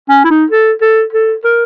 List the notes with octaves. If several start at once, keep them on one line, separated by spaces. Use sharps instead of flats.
C#4
E4
D#4
A4
A4
A4
A#4